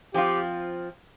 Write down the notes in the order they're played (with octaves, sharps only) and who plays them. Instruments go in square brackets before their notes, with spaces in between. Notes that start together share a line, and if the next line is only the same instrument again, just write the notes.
[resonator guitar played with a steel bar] F3 C4 F4 [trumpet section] G4